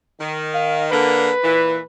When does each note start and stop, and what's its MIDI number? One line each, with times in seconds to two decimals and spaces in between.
0.20 0.90 51
0.54 0.85 77
0.91 1.29 50
0.91 1.29 58
0.91 1.82 71
1.43 1.77 46
1.43 1.77 52